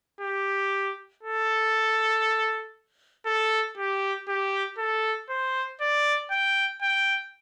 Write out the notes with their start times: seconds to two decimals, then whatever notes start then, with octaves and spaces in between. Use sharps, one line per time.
0.21 G4
1.23 A4
3.26 A4
3.78 G4
4.28 G4
4.78 A4
5.30 C5
5.81 D5
6.31 G5
6.82 G5